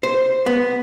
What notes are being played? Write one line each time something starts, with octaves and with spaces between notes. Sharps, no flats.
C5
B3